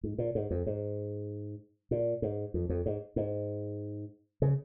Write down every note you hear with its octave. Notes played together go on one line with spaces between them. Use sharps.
G#2
A#2
G#2
F2
G#2
A#2
G#2
F2
F2
G#2
G#2
C#3